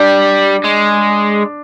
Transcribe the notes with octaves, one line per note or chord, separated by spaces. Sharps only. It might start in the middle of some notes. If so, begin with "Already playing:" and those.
Already playing: G3 D4
G#3